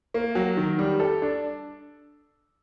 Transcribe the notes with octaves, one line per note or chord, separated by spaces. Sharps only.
A#3
F#3
D#3
G3
A4
D4